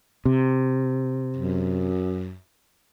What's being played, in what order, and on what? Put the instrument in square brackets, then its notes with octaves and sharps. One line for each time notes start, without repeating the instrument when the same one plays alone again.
[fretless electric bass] C3
[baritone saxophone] F#2